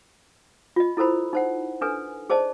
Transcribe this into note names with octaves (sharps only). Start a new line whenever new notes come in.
F4 D#5
E4 A4 A#4 C5 B5
D#4 C5 F#5
D4 A4 B4 G#5
G#4 C5 D5 D#5 A5